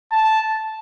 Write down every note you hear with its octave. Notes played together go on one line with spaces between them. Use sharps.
A5